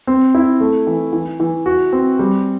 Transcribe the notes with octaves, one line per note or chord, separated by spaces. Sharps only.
C4
E4
A3
E3
E3
E3
F#4
C4
G3